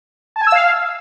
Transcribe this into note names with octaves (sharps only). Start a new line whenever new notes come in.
A5
G#5
E6
F5